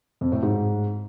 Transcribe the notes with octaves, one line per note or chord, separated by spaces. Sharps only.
F2
A2
G#2